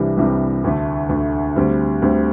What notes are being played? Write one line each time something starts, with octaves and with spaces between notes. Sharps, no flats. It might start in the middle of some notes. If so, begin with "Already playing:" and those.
Already playing: C2 C3 E3 G3 D4
C2 C3 E3 G3 D4
D2 D3 A3
D2 D3 A3
D2 D3 G3 C4
D2 D3 G3 C4